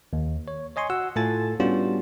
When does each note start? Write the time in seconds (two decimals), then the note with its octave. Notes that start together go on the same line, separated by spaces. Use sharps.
0.13 D#2
0.48 C#5
0.76 C#5 D#5 G#5 C6 C#6
0.90 F#4 F#5 E6
1.16 A2 F4 A4 G#5 A6
1.60 G3 B3 C#4 D4 F4 F#4